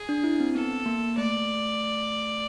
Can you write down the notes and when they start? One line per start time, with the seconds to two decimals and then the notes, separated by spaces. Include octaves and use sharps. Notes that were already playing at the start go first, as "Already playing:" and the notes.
Already playing: G#4
0.09 D4
0.24 E4
0.40 C4
0.55 B3 A4
0.86 A#3
1.17 A3 D5